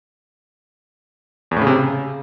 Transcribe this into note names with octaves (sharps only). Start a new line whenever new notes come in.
E2
A2
C#3
C3
C#3